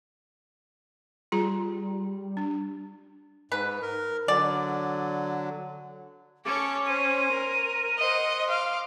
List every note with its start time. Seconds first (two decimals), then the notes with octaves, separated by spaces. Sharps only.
1.32 G3 F4 G#4 A#5
2.37 D4
3.52 G#2 B4
3.82 A#4
4.28 D3 F#3 D5
6.45 C#4 A4 C#6 D6
6.87 C5 D#7
7.32 A#4
7.99 C5 D#5 F#5
8.50 F5 C6 D6